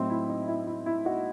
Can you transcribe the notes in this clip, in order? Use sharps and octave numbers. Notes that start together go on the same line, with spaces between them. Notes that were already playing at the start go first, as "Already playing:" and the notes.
Already playing: A2 F#3 C4 D#4
E4
D#4
E4
E4
E4
D#4 F#4